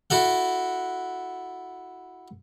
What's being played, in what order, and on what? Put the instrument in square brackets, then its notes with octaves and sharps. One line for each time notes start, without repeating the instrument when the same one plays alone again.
[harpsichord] E4 F#4 A4 F#5